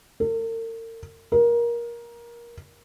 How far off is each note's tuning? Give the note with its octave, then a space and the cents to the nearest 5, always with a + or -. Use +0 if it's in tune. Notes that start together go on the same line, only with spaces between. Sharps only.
A#4 -45
A#4 +20